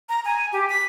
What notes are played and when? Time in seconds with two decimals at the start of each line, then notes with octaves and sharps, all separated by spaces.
0.09 A#5
0.25 G#5
0.53 G4
0.69 B6